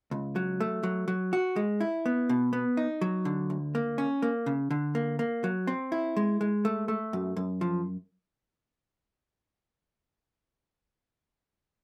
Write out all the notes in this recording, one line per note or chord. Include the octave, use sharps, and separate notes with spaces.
C#2
F#3
A3
F#3
F#3
F#4
G#3
E4
B3
B2
B3
D#4
F#3
D3
D2
A#3
C#4
A#3
C#3
D3
A#3
A#3
F#3
C4
E4
G#3
G#3
A3
A3
F#2
F#2
F3